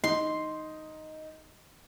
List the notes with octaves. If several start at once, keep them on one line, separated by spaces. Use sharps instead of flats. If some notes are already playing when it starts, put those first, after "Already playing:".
D#4 C6